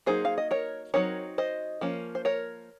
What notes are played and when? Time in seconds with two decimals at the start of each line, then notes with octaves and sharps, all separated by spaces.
0.06 F#3 A#3 D#4 G#4 C5
0.25 F5
0.38 D#5
0.51 A#4 C#5
0.94 F#3 C4 D#4 A#4 C#5
1.38 C5 D#5
1.81 F3 A#3 C#4
2.15 C5
2.25 A#4 C#5